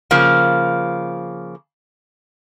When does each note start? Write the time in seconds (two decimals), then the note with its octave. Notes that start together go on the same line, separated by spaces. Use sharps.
0.11 C#3 F3 A#3